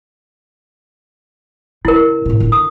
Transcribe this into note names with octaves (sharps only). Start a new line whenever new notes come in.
C#3 E4 A#4
A2 C3
D3 F4
D#6